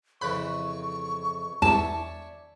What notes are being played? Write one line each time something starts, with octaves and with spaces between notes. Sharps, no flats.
F2 C#3 E3 B5 C#6 F#6
E2 D4 C#5 E5 A5